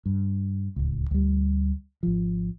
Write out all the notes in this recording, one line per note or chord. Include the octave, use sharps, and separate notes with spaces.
G2
D1 C#2
D2 G3
G#1 F3